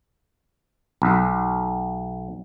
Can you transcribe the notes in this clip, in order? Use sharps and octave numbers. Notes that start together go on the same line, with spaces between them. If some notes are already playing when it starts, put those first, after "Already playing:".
B1